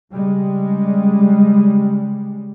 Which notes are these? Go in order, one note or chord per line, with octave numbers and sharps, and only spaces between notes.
C#3 G3 G#3